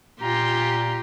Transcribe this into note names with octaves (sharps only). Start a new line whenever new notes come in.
A#2 F4 G4 A#5